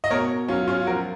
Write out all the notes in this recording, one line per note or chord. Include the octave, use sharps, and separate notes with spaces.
D#5
B2 A#4 C#5
F#3 C#4 F4
C#4 F4
F3 F#4 A#4